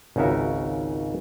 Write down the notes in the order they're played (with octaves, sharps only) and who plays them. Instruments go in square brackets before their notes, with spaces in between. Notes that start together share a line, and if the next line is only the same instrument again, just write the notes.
[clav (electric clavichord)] G#1 C#2 C#3 F#4 A#4 E5